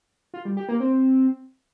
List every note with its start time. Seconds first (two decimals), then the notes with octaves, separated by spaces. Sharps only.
0.34 F4
0.45 G3
0.57 G4
0.69 A#3
0.80 C4